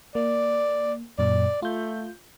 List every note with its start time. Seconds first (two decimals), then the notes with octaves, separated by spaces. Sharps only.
0.15 A#3 D5
1.19 F#2 A#2 D5
1.62 A3 F4 G6